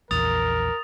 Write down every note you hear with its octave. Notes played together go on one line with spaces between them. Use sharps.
A#1 E2 A#4 D#6 A6 F7